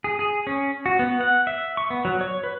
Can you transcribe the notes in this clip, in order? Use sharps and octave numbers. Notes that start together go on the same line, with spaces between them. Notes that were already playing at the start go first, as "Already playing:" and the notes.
G#4
G#4
C#4
F#4
B3
F#5
E5
C#6
B3
F#3
C#5
B4